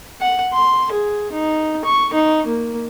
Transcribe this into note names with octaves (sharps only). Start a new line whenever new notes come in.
F#5
C6
G#4
D#4
C#6
D#4
A#3